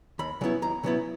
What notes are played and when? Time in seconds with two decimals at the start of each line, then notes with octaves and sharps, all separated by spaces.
0.19 D#2 B5
0.41 C#3 F#3 B3 E4
0.62 D#2 A#5
0.83 C#3 F#3 B3 E4